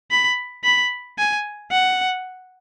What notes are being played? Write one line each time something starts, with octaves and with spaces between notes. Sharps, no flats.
B5
B5
G#5
F#5